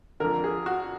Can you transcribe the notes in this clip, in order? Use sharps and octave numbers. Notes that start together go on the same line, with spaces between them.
F2 D3 A#4
G#4
F#4